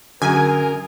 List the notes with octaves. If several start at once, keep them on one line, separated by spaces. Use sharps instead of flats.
F#2 D3 G#4 A#4 G#5